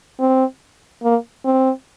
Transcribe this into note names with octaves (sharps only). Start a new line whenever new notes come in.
C4
A#3
C4